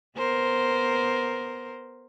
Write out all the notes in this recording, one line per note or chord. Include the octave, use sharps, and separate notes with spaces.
B3 A#4 C5